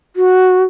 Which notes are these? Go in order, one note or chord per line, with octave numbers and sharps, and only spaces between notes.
F#4